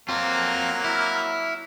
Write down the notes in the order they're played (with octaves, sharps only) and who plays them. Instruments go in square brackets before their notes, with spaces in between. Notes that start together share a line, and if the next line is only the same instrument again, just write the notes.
[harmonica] F#3 A#3 F6 [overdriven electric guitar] C4 F4
[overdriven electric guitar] E4